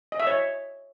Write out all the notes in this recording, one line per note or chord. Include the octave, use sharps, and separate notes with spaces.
D#5
E5
C#5